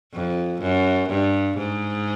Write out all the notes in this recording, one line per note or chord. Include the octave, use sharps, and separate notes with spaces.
F2
F#2
G2
G#2